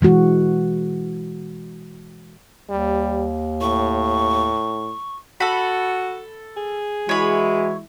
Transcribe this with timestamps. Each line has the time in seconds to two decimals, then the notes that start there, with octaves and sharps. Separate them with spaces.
0.01 B2 E3 G#3 F#4
2.69 D#2 G3
3.61 A2 C#6
5.40 F#4 A4 B5
6.57 G#4
7.09 E3 G#3 E4 F#4 C#5 B5